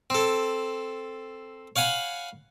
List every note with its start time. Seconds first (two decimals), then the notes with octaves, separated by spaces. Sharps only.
0.10 C4 A4
1.76 C#5 F5 F#5 G#5 B5